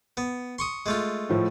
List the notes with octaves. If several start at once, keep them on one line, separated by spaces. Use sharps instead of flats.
B3
C6 C#6 D#6
G#3 A3 F4
A2 F3